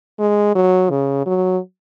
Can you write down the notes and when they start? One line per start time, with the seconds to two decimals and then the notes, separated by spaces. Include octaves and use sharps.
0.19 G#3
0.55 F#3
0.90 C#3
1.26 F#3